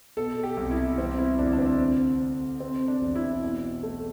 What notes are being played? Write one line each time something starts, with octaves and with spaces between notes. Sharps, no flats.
B2 A4
G4
C2
E4
E3 C4
E4
D2 D4
D4
C4
C3
C3
C3 C4
D4
E1
E4
B2
A3